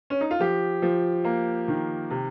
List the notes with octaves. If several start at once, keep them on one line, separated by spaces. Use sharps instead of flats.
C#4
D#4
F4
F3 G4
F3
A#3
D#3
C3